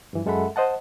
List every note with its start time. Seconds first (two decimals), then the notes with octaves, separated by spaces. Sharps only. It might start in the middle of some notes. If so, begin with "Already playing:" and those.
0.13 G2 E3
0.26 F#2 G#3 A4 E5 F#5 B5
0.56 C5 D#5 F#5 A5